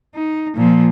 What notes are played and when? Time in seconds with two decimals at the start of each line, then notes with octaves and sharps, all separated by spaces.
0.15 D#4
0.56 A#2 F3